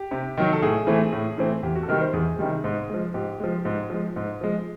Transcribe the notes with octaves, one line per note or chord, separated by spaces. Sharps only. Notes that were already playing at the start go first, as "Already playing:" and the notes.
Already playing: G4
C3
D#3 F#3
A4
A2 G#4
E3 A3 C4
A2
E3 A3 C4
E2 G4
F#4
A4
C3 D#3 G3 A#4
C5
E2 G#4
C3 D#3 G3
G#2
F3 G#3
G#2 G4
F3 G#3
G#2
F3 G#3
G#2
F3 G#3